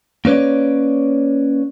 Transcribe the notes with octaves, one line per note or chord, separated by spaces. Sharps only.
A#3 C#4 B4 C#5 D5